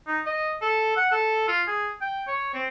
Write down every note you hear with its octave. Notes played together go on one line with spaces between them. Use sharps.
D#4
D#5
A4
F#5
A4
F4
G#4
G5
C#5
C4